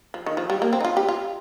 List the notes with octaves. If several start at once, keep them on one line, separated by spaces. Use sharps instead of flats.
F3
D#3
F3
G3
A#3
C4
D#4
F4
G4
F4